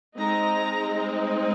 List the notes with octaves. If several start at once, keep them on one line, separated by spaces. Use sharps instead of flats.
G#3 C4 D#4 A#5